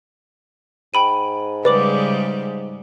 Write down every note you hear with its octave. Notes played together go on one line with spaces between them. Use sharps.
G#2 G5 B5 D#7
C#3 G3 G#3 B4 D5 D6 F#7